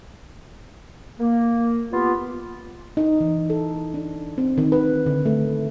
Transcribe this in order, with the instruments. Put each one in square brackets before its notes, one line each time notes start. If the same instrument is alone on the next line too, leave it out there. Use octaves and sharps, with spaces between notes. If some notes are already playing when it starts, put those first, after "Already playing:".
[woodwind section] A#3
B3 F4 G4
[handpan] D#4
E3
A4
D4
C4
D#3
B4
D3
A3